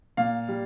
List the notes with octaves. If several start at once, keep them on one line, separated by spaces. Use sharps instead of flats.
A#2 F5
G3